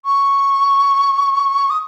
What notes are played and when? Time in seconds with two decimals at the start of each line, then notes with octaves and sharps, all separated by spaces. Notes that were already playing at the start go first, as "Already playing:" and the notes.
0.05 C#6
1.70 D#6